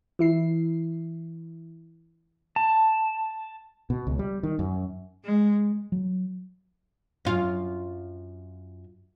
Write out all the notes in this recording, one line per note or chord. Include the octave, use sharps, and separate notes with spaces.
E3 E4 C7
A5
B2
C#2
G3
D#3
F#2
G#3
F#3
F#2 F4